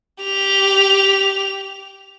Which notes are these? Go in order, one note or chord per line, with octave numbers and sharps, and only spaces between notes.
G4 F7